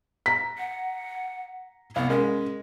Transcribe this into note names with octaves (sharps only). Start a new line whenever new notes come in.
A#5 B6
F#5
C2 B3
G#3 C#4 A#4